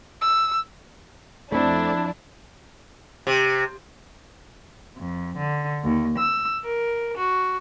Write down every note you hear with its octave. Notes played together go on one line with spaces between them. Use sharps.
E6
F2 A3 C4 D4 E4
C3
F2
D3
D#2
E6
A#4
F#4